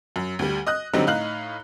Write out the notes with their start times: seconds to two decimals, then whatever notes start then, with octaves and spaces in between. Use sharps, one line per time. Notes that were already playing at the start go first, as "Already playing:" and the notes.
0.16 F#2
0.39 D2 G3
0.67 D#5 D#6 F#6
0.93 D3 F#3 G3 C4 D#4
1.07 A2 D#4 F5 F#6 F#7